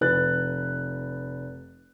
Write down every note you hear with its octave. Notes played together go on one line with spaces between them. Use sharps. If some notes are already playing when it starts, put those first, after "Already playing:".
F1 B4 F#6 A6